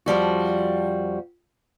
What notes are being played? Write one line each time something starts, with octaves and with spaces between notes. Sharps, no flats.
F2 F3 G3 F#4